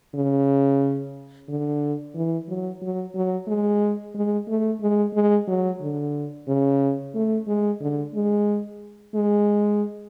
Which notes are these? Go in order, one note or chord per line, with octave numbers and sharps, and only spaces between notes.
C#3
D3
E3
F#3
F#3
F#3
G#3
G#3
A3
G#3
G#3
F#3
D3
C#3
A3
G#3
D3
G#3
G#3